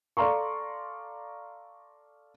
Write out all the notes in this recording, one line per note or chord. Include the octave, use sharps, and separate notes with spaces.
A4 D5 F5 A#5 C6 C#6